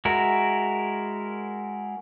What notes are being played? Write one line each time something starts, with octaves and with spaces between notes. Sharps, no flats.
G#3 E4 F#4 A#4